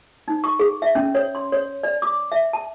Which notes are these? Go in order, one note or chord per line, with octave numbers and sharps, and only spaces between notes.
D#4
C#6
G#4
E5
C#4
C#5
C6
C#5
D5
D6
E5
A5